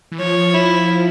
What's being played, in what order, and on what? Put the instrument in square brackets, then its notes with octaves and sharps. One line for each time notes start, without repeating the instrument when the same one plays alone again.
[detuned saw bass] E3
[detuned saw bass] F3 [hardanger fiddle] C#5
[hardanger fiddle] E4